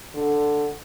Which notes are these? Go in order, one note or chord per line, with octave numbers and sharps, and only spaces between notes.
D3